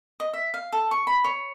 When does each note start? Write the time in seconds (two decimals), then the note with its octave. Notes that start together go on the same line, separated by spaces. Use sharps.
0.20 D#5
0.33 E5
0.54 F5
0.72 A4
0.91 C#6
1.07 B5
1.24 C#5